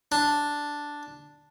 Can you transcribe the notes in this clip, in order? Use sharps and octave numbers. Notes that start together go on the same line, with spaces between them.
D4